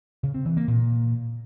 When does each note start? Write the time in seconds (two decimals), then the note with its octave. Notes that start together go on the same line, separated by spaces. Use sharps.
0.23 C#3
0.34 C4
0.45 E3
0.57 A#3
0.68 A#2